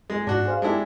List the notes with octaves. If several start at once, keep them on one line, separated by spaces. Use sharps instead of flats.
G#3
G#2 D4 F#4
G#4 C5 F5
G#3 D4 E4 G4 A4